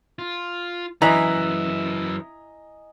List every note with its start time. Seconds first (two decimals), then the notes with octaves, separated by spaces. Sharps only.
0.19 F4
1.02 F#2 E3 E4 D#5 G#5 A#5